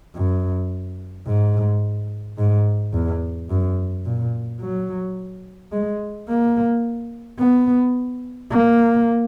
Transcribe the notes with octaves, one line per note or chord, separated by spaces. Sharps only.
F#2
G#2
G#2
E2
F#2
A#2
F#3
G#3
A#3
B3
A#3